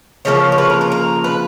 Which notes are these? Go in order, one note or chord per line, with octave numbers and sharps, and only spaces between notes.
C#3 F3 A#3 C#5
C#5
B4
A#4
A#4
A#4
B4